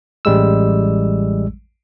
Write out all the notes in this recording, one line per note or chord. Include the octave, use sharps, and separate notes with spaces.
A1 G3 G#3 E6